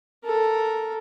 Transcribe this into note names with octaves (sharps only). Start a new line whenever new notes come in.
A4 A#4